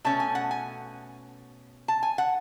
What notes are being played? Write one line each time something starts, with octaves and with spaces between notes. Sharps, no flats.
B2 A3 C#4 A5
G#5
F#5
G#5
A5
G#5
F#5